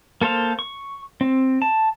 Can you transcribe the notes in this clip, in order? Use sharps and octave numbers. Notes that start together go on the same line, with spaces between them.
A#3 A4 C5 F5
C#6
C4
A5